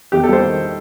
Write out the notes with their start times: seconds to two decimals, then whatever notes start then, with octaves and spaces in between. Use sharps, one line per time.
0.12 E2 G4
0.23 A4
0.29 G3 C5
0.43 D#3